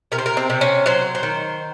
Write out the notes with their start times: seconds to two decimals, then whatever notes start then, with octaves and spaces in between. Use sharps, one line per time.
0.12 C3 A#4
0.18 C5
0.26 A#4
0.37 C4
0.50 C3
0.61 C#4
0.86 F#3 C5
1.15 C5
1.23 D#3